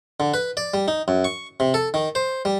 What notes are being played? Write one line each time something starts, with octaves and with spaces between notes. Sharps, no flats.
D3
B4
D5
G3
D#4
F#2
C#6
C3
A4
D#3
C5
G3